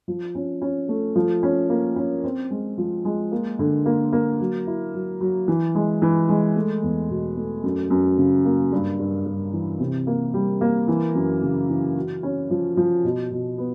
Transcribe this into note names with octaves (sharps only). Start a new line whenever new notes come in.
F3
C#4
C#4
A3
F3
C#4
A#3
C#4
C4
G#3
F3
G#3
A#3
D3
A#3
A#3
F#3
E4
F#3
F#3
E3
G#3
E3
G#3
A3
E2
B2
A3
F#2
F#2
C#3
A#3
G2
G2
G2
E3
C3
A#3
G3
A#3
E3
F#2
C#3
E3
F#4
C#4
F3
F3
B2
B2
B3